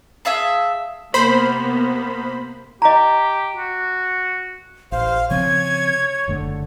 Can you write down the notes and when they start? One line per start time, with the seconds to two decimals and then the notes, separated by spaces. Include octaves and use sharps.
0.25 G#4 E5 F5 A5
1.14 C3 A#3 B3 C5 B5
2.82 G4 D#5 A#5
3.56 F#4
4.92 A1 C5 F5
5.31 C#3 F3 C4 C#5 G#6
6.28 F#1 D3 A3